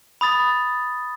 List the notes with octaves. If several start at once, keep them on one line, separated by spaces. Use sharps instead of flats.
B5 D#6 A6